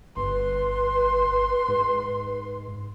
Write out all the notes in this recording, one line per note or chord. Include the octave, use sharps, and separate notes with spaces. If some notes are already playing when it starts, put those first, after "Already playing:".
G1 B4 C6
G#2